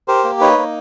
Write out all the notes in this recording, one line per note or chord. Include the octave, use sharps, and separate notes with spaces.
G4 A#4 C5
A#3
D#4 B4 C#5
A#3